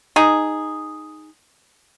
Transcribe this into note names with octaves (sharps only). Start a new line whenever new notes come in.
D#4 G#4